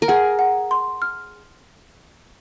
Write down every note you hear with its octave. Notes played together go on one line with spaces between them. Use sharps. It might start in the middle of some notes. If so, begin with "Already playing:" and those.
A#4
G#4 F#5
F#5
C6
F6